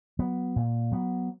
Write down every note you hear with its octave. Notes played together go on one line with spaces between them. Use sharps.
F#3 B3
A#2
F#3 B3